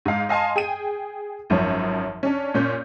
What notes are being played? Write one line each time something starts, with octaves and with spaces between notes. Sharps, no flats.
G#2 F5
D#5 F5 G#5 A5 C6
G#4 G5 D#7
G#1 F#2 F3 C#5
C#4 D4
A#2 C#4 G6